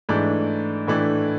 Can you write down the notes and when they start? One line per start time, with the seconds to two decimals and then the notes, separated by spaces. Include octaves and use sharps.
0.09 G#2 E3 A3 D4
0.87 A2 E3 A3 D4